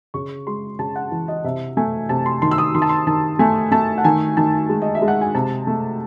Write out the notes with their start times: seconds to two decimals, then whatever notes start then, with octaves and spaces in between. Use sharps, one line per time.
0.14 C#3 C#6
0.47 G#3 C6
0.79 C#3 A5
0.96 F#5
1.11 E3
1.28 D#5
1.44 C3 E5
1.77 A3 G#5
2.09 C3 A5
2.26 C6
2.42 D#3 C6
2.51 E6
2.58 D#6
2.75 D#3 C6
2.82 A5
2.89 C6
3.07 D#3 A5
3.39 A3 G#5
3.72 A3 A5
3.98 F#5
4.04 D#3 G#5
4.37 D#3 A5
4.69 G#3
4.82 D#5
4.95 E5
5.02 G#3
5.08 F#5
5.21 G#5
5.34 C3 A5
5.67 A3